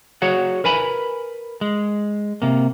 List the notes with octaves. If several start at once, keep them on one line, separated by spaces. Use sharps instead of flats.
F#4 G#4 C#5 F#5
A#4 B4 G#5 B5
G#3
C3 A#3